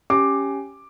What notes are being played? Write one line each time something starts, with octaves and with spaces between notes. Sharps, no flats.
C#4 G4 D6